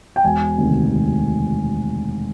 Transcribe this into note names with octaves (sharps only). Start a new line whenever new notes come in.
G5
E1 G#5
D2 C3 D#3
E1